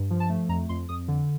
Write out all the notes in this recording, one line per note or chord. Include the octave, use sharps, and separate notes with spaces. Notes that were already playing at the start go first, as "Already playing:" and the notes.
Already playing: G2
F3
A5
A3
F2 A#5
F2 C6
F2 D#6
D3